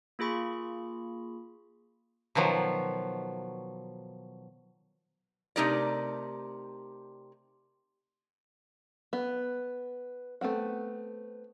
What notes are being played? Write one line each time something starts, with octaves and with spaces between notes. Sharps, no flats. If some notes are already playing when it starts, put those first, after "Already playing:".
A#3 F4 G#4 B5 C#6
B2 D#3 F3 F#3
C3 A3 D#4 G4 A#4 D5
B3
A3 B3 C4 F#5